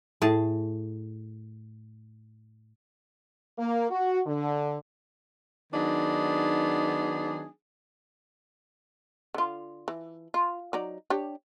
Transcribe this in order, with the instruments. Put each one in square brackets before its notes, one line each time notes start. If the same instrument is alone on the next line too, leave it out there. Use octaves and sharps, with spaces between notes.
[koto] A2 G#4 A5
[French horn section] A#3
F#4
D3
[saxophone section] D#3 F#3 B3 D4 D#4 G#4
[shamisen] D3 F4
E3
F4
F#3 D#4 D5
D4 G4 C#5